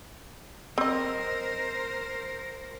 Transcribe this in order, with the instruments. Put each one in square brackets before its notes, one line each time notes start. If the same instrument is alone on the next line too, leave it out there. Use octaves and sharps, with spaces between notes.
[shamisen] C4 D#5 [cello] A#4 C5